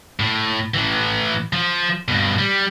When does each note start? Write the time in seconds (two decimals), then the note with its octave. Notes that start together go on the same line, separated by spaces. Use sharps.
0.20 A2
0.74 A2 E3
1.53 F3
2.08 G2 B2
2.38 G3